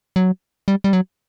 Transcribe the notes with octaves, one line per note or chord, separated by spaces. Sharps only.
F#3
G3
G3
F#3